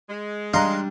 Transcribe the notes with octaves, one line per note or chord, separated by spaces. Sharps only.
G#3
G3 D4 D#4 F5 A#5 C6 F#6